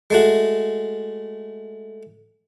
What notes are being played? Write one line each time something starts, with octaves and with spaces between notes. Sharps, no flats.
G#3 A3 F#4